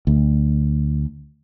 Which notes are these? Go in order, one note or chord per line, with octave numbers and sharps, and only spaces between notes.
D2